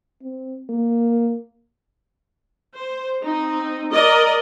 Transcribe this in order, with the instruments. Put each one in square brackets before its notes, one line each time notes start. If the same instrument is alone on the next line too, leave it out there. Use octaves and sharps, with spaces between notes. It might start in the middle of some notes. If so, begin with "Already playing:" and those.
[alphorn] C4
A#3
[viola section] C5
C4 D#4
A#4 D5 D#5